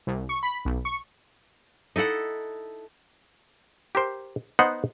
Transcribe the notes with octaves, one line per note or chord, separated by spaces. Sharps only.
C2
C#6
B5
B1
C#6
D#4 E4 A4 F#5
G4 A#4 C5
B3 D#4 C5 D#5 F#5